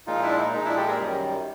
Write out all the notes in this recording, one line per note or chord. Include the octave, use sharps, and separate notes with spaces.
A#2 F3 G#3 D#4 F4
D4 E4
D#4
A#2 F3 G#3 D#4
D4 E4
G4 A4
G#4 A#4
F#2 D#3 G3